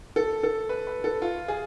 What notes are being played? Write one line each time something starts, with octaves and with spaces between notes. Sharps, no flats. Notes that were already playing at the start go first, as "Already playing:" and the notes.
A4
A4
B4
B4
A4
F4
G#4